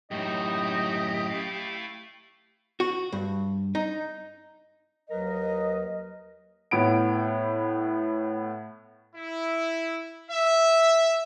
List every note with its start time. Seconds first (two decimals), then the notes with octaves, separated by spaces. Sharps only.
0.11 F#2 A2 D#4 F#4 G4 D#5
1.28 A3 E4 F5
2.80 F#4
3.13 G2
3.75 D#4
5.10 D#2 F#3 A#4 B4 D#5
6.71 A2 B3 D7
9.15 E4
10.30 E5